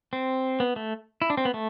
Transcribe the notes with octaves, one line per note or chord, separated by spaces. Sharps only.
C4
B3
A3
E4
D4
C4
B3
A3